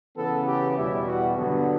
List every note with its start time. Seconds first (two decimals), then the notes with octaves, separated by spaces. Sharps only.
0.17 C#3 E3 B3 A4
0.47 G4
0.76 E2 B2 G3 E4
1.07 F#4
1.37 G2 D3 F#3 B3